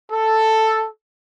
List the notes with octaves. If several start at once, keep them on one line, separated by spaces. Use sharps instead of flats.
A4